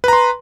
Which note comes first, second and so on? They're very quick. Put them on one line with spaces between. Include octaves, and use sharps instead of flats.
B4 A#5 C6